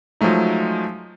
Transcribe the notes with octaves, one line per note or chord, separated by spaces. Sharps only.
F3 F#3 G#3 A3 D#4